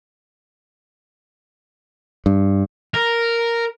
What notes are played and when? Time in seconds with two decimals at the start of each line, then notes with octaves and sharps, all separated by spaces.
2.26 G2
2.94 A#4